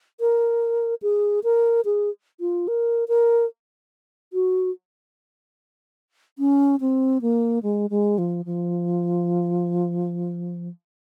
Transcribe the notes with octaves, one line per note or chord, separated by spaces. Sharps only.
A#4
G#4
A#4
G#4
F4
A#4
A#4
F#4
C#4
C4
A#3
G#3
G#3
F3
F3